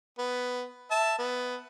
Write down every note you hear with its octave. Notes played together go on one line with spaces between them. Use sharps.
B3
E5 A5
B3